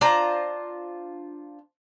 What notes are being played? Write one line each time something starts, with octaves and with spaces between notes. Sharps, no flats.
D4 F4 C5 A#5